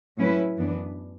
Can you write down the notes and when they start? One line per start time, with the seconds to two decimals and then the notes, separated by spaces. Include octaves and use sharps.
0.17 A2 F#3 C#4 E4 B4
0.57 F#2 E3 B3 D4